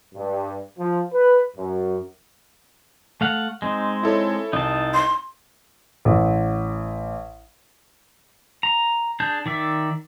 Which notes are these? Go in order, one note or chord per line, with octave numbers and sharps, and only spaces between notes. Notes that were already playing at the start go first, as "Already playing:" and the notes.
G2
F3
B4
F#2
A3 F5 F#5
G#3 C4 D#4
E4 A4 C#5
C2 D#4 A5
C6
A1
A#5
D4 G#4 A5 G6
D#3 D5 E5